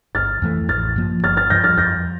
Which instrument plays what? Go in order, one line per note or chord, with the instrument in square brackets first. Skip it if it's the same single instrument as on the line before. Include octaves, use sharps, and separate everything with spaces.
[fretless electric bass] G1 [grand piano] F6 A6
[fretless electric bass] F2 E3 A3
[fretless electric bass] A1 [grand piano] F6 A6
[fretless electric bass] G2 F3 A#3
[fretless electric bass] G1 [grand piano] F6 A6
[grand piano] F6 A6
[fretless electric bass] G2 F3 [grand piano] G6 A#6
[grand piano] F6 A6
[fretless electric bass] F2 [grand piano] G6 A#6